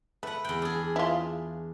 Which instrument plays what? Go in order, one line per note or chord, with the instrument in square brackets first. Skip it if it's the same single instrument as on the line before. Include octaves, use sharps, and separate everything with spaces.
[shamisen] A3 [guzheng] B4 F#5
[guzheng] E2 G5
D4 G#4
[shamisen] E4 F4